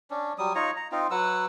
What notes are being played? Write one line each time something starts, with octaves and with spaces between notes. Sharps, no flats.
C#4 D4
F#3 G3 D#6
D#4 F4 C#5 A#5
A#5
C4 D#4 F4
F#3 B4 F#5 E6